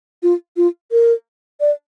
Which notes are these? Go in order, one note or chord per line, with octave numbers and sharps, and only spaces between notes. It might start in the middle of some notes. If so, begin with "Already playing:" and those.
F4
F4
A#4
D5